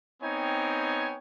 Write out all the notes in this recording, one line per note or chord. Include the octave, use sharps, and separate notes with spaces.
B3 C4 D#4 C#5 G5 G#5